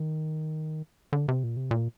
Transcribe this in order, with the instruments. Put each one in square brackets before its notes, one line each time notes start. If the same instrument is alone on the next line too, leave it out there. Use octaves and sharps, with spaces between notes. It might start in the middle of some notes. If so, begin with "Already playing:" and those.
Already playing: [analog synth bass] D#3
D3
C3
A#2
C3
A#2